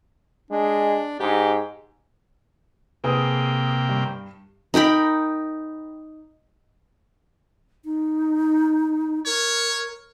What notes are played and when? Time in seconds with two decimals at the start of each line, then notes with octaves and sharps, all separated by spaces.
0.51 G#3 D4
1.20 G#2 G4
3.04 C3 A#3 G#4 B4 G5
3.89 G2
4.74 D#4 A#4 G5 B5
7.85 D#4
9.26 A#4 C#5